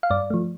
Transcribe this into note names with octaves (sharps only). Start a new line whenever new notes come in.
F5
G2 D5
F3 A3